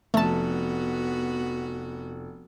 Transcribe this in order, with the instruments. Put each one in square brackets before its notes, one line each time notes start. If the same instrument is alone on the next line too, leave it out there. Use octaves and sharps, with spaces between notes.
[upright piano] F1 [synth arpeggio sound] A3 A5 [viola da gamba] B3 F#4